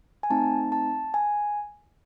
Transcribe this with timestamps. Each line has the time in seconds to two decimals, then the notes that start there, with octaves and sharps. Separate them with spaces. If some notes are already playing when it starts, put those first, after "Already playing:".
0.23 G#5
0.30 A3 C4 D#4 A5
0.72 A5
1.14 G#5